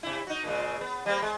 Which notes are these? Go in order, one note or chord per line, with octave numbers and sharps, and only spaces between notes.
C3 E4
D#4 F#4
A#2 C#3 G#3
B3
G3 A#3 C4
G#3